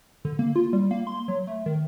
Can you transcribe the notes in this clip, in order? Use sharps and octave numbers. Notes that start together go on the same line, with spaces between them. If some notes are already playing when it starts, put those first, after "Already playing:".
D3
A#3
F4
G3
A#3
C6
F#3
A3
D#3